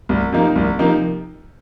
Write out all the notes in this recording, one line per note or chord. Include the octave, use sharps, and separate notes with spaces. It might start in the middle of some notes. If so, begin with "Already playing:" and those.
C2
C3 F3 A#3 D#4
C2
C3 F3 A#3 D#4